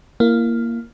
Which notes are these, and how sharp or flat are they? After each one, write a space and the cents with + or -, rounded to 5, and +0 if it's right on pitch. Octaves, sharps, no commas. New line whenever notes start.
A#3 +0 E4 +30